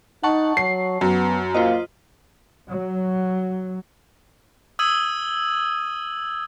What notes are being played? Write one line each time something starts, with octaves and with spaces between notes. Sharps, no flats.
D#4 F#5 A5 C#6
F#3 C7
F#2 B3
A#3 F4 C5 D#5
F#3
D#6 E6 G#6 D#7 F#7